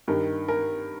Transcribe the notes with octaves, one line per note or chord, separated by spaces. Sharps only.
G2 D#3 A#4
A#4